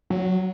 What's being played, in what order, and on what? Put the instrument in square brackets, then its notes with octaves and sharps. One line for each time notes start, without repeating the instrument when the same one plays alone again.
[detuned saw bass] F#3